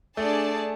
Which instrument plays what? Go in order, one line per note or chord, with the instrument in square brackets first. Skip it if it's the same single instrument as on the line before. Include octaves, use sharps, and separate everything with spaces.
[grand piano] A3 [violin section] D4 G#4 D5 A5